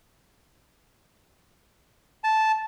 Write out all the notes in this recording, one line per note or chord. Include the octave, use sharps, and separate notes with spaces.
A5